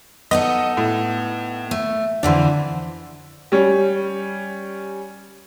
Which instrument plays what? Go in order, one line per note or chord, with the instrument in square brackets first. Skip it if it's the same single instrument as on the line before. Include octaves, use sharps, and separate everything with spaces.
[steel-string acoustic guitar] B3 D#4 A4 [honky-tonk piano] D#5
[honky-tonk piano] A2
[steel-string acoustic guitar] A3
[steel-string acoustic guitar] F2 D3 E3 [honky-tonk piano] D4 C5
[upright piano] G3 C#4